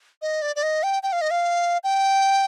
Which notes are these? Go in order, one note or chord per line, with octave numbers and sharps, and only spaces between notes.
D#5
D5
D5
D#5
G5
G5
F5
D#5
F5
G5